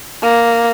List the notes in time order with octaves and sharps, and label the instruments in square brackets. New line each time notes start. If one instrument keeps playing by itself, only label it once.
[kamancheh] A#3